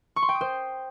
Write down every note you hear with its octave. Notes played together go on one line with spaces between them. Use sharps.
C#6
C6
G5
D#6
C5